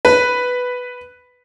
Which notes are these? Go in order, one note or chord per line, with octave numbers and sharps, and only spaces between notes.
B4